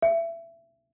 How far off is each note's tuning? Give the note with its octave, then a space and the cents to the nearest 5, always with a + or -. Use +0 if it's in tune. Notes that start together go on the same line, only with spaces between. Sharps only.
E5 +25